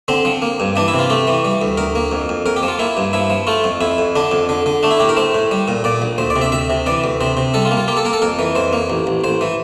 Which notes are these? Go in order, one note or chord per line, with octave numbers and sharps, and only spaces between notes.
D3 C4
F3
A#3
G2
E3 D4
E4
C3
F4
A3 G4
E3
G3
D2
D2 A#4
A#3
F2
F2
F2 A#4
G4
F3
F4
A#3 E4
G2
F3 E4
F3
A3 F4
F2
F2 E4
F2
D3 D4
F2
D3
D3
A3 D4
E4
A2 G4
A#4
A3 C5
A2
G3
A#2
A#2 D5
A#1
D2 C5
D5
C3
E5
D2 E5
C3
E3 D5
D2
C3 C5
C3
G3 A4
F4
A#3
F4
A#3 G4
A4
A#3 A#4
A4
F2 A#4
E3
F2 C5
A#3
A1
A1
A1 C5
E3